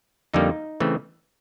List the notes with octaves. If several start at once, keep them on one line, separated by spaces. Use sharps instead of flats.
F2 D3 G3 A#3 D#4
C#3 E3 A3 C4